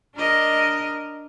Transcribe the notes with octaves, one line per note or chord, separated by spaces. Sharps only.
D4 A#4 D#5